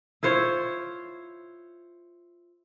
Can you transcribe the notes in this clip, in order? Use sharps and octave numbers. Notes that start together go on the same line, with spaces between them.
E4 F4 C5 C#5